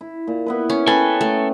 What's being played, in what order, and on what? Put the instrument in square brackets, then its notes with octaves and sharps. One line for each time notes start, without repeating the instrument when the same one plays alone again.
[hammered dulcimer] E4
A#2
B3 E4 B4
[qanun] C#4
[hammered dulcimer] C#4 G5 [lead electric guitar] A4 G#5 [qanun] B4
[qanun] A3